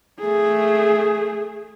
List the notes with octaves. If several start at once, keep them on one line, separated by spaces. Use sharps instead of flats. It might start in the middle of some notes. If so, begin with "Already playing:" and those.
A3 G#4